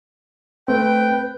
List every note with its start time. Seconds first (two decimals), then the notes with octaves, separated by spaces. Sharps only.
0.68 A3 C4 B4 G5